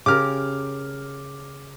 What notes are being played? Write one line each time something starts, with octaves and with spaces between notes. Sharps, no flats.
C#3 G4 A#4 D6 F6